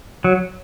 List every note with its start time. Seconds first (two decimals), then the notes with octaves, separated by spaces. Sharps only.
0.24 F#3